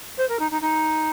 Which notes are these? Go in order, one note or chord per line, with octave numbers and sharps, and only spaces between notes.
C5
A#4
D#4
D#4
D#4